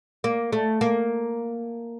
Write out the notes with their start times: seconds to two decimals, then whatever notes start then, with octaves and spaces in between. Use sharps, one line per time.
0.24 A#3
0.52 A3
0.81 A#3